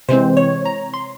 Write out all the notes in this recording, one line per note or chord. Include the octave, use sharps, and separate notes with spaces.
C3 E3 G#3 C4 C5
C#5
A#5
C6